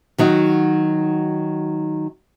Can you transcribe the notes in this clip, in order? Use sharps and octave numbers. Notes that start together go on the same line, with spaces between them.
D#3 F#3 D#4 F#4